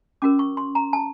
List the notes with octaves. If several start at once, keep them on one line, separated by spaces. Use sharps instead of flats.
C#4 F#4 A#4 D6
C#6
C6
A#5
A5